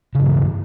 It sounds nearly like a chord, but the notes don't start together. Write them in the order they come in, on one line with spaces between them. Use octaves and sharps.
C#3 G2 E3